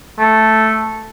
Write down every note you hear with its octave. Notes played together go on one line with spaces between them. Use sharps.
A3